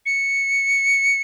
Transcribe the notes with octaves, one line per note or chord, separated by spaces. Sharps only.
C#7